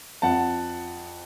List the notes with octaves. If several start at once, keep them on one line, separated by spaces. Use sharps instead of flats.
F2 F#5 A5